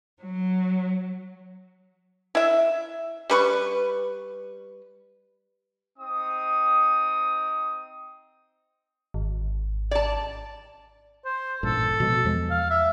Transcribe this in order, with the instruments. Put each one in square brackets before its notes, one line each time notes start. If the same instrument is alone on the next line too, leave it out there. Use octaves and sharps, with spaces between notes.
[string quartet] F#3
[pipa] E4 E5
G3 B4 C#6
[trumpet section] C4 D#4 D#6
[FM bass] G#1
[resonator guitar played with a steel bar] D5 A5
[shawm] C5
[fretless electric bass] A1 G2 A#2 [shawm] A4
[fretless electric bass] B2 F3 G#3
E2 F3 G#3
[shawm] F5
E5